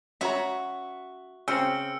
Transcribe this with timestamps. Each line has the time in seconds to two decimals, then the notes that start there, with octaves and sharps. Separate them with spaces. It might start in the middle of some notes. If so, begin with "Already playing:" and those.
0.21 C#4 F#4 C#5 E5 A#5
1.48 C#3 C4 C5 G5 G#5 E6 F6 C#7